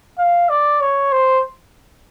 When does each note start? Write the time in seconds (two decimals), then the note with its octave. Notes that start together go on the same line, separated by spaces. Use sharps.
0.18 F5
0.49 D5
0.81 C#5
1.12 C5